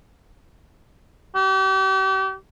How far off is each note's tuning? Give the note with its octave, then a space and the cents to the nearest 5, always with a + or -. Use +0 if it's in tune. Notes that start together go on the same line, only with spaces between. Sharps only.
G4 -40